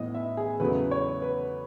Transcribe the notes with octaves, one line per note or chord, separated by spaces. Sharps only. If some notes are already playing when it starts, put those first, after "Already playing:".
Already playing: A2 E3 B3 D#5
E5
G#4
E2 C#3 F#3 A3 B4
C#5
B4